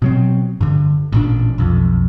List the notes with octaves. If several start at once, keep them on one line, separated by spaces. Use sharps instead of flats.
B2 F#3 C4
G2 D3
A1 A#2 D4
B1 F2